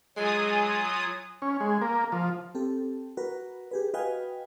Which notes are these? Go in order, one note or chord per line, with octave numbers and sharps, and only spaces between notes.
F#3 G#3 F4 G#5 D#6
C#4
G#3
A#3
F3
C4 G4 A4
F#4 A#4 B4
G4 G#4 B4
F#4 B4 D#5 F5 G5 G#5